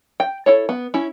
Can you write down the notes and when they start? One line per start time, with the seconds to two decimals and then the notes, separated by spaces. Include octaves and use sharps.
0.20 G5
0.46 E4 A4 C#5
0.69 B3
0.94 C#4 E4